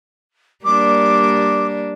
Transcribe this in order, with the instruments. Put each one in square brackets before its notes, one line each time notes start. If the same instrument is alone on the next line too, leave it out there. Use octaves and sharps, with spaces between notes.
[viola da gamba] G3 A#3 D4 [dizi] D6